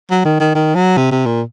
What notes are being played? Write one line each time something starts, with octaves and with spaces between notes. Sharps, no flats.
F#3
D#3
D#3
D#3
F#3
C3
C3
A#2